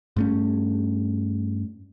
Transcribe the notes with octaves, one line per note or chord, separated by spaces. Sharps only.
G2 A3 C#4